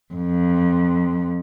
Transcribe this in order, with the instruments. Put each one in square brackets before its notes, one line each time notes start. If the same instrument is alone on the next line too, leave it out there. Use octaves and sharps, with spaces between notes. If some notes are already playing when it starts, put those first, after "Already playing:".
[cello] F2